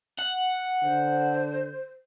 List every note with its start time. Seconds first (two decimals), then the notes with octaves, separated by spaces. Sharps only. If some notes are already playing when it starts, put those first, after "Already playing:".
0.19 F#5
0.84 D3 C5